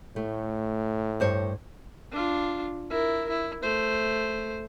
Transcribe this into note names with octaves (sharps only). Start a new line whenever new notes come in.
A2 A3
G2 C5 C#5
D4 F4
E4 A#4
E4
A3 C5